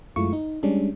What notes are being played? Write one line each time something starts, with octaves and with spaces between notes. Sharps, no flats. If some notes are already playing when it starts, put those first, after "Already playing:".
F#2 G#3 A3 E4 F4 C#6
D#4
G3 G#3 C#4 D4